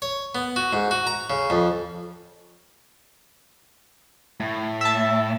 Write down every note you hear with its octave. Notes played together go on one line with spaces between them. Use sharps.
C#5
B3
F#4
G#2
F#4
A#5
C#3
F2
A2
E5 A5